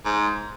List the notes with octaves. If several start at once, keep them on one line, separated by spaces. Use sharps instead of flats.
G#2